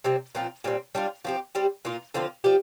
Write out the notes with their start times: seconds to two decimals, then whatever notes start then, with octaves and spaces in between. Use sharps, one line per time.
0.04 C3 G3 C4
0.35 A#2 F3 C4 F4
0.64 A#2 G3 C4
0.95 G3 D4 F4
1.25 F3 C4 G4
1.55 G3 C4 G4
1.85 A#2 A#3 F4
2.14 D3 F3 C4 F4
2.44 F3 D4 G4